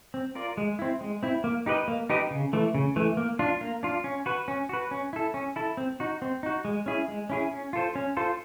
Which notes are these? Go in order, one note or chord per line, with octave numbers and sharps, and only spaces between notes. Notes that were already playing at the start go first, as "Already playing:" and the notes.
C4
F4 A#4 D5
G#3
C4 E4
G#3
C4 E4
A#3
D#4 G4 B4 D#5
A#3
D#4 G4 B4 D#5
C#3
E3 A3
C#3
E3 A3
A#3
D4 F4
A#3
D4 F4
C#4
F#4 B4
C#4
F#4 B4
C#4
E4 A4
C#4
E4 A4
C4
D#4 F#4
C4
D#4 F#4
G#3
C#4 E4 G#4
G#3
C#4 E4 G#4
C#4
F4 A4 C5
C#4
F4 A4 C5